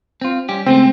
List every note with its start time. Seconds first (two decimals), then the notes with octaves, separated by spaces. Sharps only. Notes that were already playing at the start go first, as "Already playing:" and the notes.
0.21 C4 F4
0.49 G3 C#4 G4
0.66 C#3 G#3 A3 C4